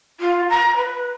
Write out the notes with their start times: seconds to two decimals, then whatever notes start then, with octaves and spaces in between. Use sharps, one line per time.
0.20 F4
0.50 A#5
0.77 B4